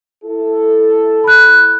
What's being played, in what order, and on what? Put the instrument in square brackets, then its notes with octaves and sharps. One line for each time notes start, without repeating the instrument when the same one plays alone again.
[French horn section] E4 A4
[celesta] B5 F#6